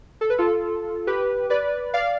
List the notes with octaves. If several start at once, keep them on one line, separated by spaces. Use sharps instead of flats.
A4
B4
F4 A4
G4 B4
B4 D5
D5 F5